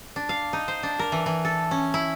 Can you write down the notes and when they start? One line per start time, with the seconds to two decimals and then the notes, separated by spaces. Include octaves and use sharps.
0.16 D4
0.29 F5
0.53 D#4
0.68 C5
0.83 D4
0.99 A#4
1.12 E3
1.26 E3
1.45 A4
1.71 C#4
1.94 E4